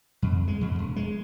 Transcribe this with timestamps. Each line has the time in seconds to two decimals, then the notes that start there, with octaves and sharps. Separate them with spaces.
0.22 F2
0.48 G#3
0.61 F2
0.79 E1
0.96 G#3